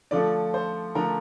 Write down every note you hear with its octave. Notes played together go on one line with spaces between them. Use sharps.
D3 F3 A3 D5
C5
D3 F3 A3 A#4